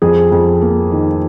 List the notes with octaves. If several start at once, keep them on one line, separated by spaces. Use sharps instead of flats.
F2 G#4
F2
A#3
D#3